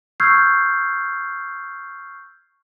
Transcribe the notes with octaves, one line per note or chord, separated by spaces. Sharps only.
C#6 E6 F6 G6 G#6 C7